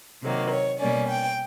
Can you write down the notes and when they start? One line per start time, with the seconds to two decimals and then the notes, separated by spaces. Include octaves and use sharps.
0.22 C3 D#3 F#3 A#3
0.50 C#5
0.79 B2 G3 A#3 C#4 D5
1.08 G5